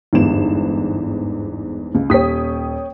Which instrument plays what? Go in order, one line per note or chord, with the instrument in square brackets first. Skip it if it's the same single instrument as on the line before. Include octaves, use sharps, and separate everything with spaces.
[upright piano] G1 [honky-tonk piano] E2 G#2 E7
[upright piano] C#2
[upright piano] D#1 B6 [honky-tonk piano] C#5 G5 D#6